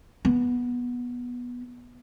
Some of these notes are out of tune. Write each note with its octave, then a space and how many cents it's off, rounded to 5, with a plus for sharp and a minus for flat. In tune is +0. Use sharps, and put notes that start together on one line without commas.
B3 -15